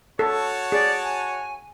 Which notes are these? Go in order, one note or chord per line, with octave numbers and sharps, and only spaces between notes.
F#4 A4 C#5 A5
G#4 D5
G#5